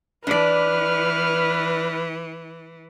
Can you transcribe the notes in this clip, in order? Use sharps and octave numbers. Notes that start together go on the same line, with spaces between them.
E3 D4 B4 D5 F6